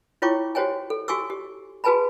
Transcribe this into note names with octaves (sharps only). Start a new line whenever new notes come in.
E4 F4 C#5 G5 C#6 D6
F#4 G4 C5 C#5 G5 G#5
A4
F#4 G4 G#5 C#6 D6 E6
G4
F#4 G#4 B4 G#5 A5 B5